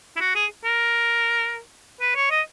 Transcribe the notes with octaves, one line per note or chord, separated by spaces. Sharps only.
E4
F#4
G#4
A#4
B4
C#5
D#5